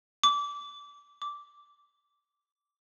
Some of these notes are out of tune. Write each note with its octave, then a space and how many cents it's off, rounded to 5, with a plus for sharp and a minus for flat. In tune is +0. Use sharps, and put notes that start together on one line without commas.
D6 -25
D6 -10